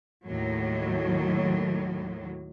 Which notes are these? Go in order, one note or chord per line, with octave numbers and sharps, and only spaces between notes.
D#2 A2 F#3